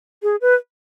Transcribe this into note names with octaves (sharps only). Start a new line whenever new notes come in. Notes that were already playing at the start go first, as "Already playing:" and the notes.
G#4
B4